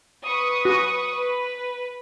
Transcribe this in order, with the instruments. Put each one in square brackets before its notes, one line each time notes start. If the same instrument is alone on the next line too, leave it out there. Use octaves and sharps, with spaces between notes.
[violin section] B4 C#6 D#6
[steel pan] F#4
[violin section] B4